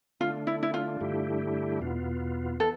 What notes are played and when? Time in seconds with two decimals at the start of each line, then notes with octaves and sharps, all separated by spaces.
0.20 D3 A3 D4 F4
0.47 E4
0.63 E4
0.74 F4
1.01 G2 D3 A3 E4 G4
1.79 E2 B2 B3 F4
2.60 E3 B3 A4